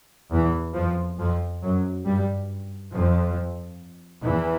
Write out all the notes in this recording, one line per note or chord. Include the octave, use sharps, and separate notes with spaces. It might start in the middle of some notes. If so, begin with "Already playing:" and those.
E2 E3
F2 F3
F2 F3
F#2 F#3
G2 G3
F2 F3
E2 E3